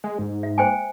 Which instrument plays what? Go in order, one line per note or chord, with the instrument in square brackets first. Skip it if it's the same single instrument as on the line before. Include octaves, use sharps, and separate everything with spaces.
[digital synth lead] G#3
G#2
[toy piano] E5
C5 G5 G#5